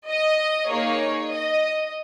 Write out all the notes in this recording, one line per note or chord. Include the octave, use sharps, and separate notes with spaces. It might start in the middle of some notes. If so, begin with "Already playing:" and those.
D#5
A#3 D#4 G#4 C#5
D#5